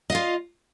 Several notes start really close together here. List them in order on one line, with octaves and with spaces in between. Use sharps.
D#5 F5 F4